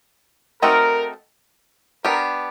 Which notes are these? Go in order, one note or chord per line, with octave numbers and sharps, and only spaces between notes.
A3 C4 D#4 F#4 A4 A#4
B3 D4 G4 A#4